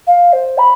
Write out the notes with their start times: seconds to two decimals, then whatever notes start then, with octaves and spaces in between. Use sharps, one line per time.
0.07 F5
0.33 C5
0.58 B5